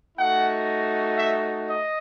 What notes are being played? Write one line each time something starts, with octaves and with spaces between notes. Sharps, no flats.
A3 D#4 F#4 F#5
E5
D#5